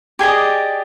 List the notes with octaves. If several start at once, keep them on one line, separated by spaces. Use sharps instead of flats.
G4 G#4 D5 D#5